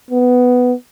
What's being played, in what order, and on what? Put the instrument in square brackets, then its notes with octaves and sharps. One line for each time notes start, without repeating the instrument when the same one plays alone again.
[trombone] B3